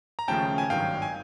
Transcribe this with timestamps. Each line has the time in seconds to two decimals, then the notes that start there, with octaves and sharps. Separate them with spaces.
0.19 A#5
0.28 D#2 C#3 F3 A3 C#4 G5 A5
0.58 G#5
0.70 G#1 G2 D#3 F#3 F5 G5
1.02 G#5